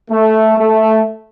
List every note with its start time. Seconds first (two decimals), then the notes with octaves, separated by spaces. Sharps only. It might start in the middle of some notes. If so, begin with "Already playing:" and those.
0.10 A3
0.58 A3